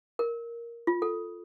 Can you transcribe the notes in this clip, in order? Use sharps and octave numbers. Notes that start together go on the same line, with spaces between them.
A#4
F4
A4